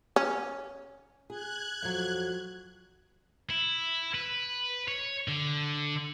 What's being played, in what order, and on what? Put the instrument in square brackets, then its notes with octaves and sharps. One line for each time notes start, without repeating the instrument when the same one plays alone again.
[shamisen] C#4
[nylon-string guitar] G#4 [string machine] F#6 G#6
[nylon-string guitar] F2 F#3
[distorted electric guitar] E4
B4
C#5
D3